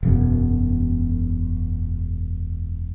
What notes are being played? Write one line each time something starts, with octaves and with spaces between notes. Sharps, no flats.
E1 F#2 B2